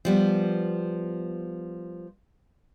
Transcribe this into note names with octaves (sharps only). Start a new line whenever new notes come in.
F3 G3 B3